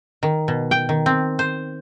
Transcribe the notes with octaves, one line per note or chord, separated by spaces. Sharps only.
D#3
B2
G5
D#3
C4
C5